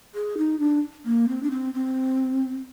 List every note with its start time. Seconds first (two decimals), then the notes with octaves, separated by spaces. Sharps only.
0.15 G#4
0.38 D#4
0.60 D4
1.05 A#3
1.28 C4
1.43 D4
1.51 C4
1.74 C4